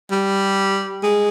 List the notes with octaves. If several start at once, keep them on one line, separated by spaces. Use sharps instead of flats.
G3
G#3